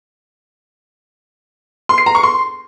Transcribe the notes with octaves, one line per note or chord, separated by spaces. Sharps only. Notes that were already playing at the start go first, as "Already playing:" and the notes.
C6
C7
A#5
C#6
C6